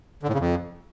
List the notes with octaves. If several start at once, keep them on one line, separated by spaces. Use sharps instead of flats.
D3
A2
C#3
F2